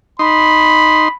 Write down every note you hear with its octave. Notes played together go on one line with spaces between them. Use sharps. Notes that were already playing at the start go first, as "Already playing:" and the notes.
D#4 B5 C6